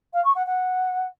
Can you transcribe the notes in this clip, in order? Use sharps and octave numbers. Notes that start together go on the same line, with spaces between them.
F5
C#6
F#5
F#5